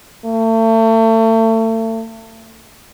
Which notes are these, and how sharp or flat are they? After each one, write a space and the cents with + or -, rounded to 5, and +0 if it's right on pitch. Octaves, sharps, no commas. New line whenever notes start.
A3 +35